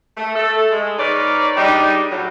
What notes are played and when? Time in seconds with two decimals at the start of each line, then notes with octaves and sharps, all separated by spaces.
0.17 A3
0.36 A3 A4
0.72 G#3
0.99 D#4 A#4 B4 C#5 D5
1.57 G3 G#3 D4 D#4
2.11 A2 F#3